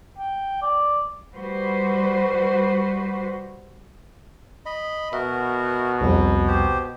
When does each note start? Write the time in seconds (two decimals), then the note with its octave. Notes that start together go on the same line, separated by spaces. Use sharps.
0.18 G5
0.62 D5
1.35 G3 F#4 B4 C5
4.66 D#5 B5
5.13 B2 F#4 A#4 E5
6.01 C2 F2 F#3
6.48 G4 C5